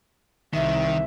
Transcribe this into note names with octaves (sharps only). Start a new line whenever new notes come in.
C2 D#3 E5